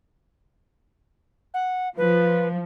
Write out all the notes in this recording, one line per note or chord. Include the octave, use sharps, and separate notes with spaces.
F#5
F3 B4